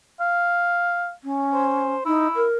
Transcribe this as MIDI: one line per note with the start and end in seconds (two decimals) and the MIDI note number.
0.21 1.12 77
1.23 1.94 61
1.54 2.03 72
2.06 2.27 63
2.06 2.45 64
2.34 2.57 70